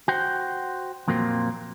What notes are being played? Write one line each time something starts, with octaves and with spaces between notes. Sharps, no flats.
F#4 C5 G5
F2 A#2 F#3 A#3 C4